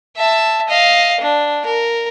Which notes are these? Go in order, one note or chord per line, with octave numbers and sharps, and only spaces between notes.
E5 A5
D#5 F5
D4
A#4